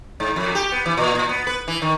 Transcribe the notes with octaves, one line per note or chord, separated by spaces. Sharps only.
G#2
F2
G4
B3
E3
A#2
A#2
B3
B4
E3
D#3